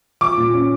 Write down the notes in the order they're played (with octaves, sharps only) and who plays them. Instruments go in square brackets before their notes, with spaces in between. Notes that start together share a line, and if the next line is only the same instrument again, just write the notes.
[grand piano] F3 [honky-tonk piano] D6
[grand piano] A#2
C#4